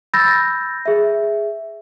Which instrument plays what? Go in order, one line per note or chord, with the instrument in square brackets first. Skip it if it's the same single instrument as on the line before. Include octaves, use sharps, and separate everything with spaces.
[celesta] B5 E6 G6 A6 A#6
G#4 E5